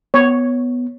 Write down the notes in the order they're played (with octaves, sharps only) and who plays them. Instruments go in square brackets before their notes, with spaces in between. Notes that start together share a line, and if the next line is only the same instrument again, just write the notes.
[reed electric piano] B3 [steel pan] C#5